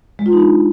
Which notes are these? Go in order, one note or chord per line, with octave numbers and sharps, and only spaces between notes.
G#3
F4
D#4
D4